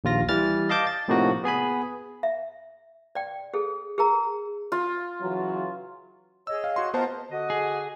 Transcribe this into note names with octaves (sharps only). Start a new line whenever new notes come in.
A#1 D#2 F4 A#6
E3 G3 F6 A6
D#5 F5 A5 D6 G6
A6
A2 C3 F3 A#3 D#4 F#4
B3 G#4 G#5 B5
E5
D5 G5
G#4 A4
G#4 A#4 A#5
F4
C#3 E3 F#3
G#4 C#5 D#5 E6
F5
F#4 C6
B3 F4 A#4 C5 D#5 A5
D3 F#4 D#5
G#4